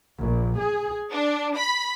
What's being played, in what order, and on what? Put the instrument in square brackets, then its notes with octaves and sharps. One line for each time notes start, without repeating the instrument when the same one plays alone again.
[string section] A#1
G#4
D4
B5